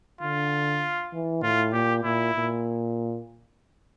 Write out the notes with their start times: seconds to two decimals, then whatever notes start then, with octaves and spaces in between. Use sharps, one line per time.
0.21 D3 F4
1.13 E3
1.42 A2 F4
1.73 A#2 G4
2.04 A#2 E4
2.35 A#2